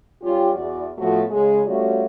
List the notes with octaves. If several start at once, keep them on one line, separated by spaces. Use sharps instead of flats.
G3 C#4 F4 G4
E2 F#4 D5
A2 F3 A3 B3 F#4
C#3 G#3 G#4
G3 A3 C#4 F4 F#4